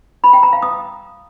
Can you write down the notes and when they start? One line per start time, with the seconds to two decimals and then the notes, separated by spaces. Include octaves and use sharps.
0.24 B5
0.33 G5
0.43 A#5
0.53 F5
0.62 D#6